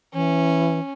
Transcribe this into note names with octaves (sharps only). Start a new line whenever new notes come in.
E3 C#4